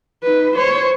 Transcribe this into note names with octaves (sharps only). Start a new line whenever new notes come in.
D#4 B4
C5 C#5